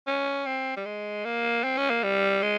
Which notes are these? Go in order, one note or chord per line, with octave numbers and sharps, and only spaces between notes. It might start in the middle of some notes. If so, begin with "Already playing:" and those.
C#4
C4
G3
G#3
A#3
C4
C#4
A#3
G3
G#3